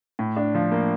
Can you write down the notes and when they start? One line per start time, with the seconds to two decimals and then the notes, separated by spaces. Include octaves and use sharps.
0.19 A2
0.36 D4
0.55 F3
0.72 A#3